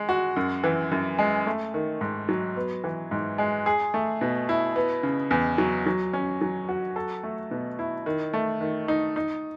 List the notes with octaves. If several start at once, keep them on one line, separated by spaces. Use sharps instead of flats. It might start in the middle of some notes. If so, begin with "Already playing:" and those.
Already playing: G#3
F#4
F#2
E3
F#2
G#3
A3
D#3
G#2
F#3
B3
E3
G#2
G#3
G#4
A3
B2
E4
B3
C#3
E2
F#3
F#3
C#4
F#3
F#4
A4
A3
B2
E4
D#3
A3
D#3
D#4
D#4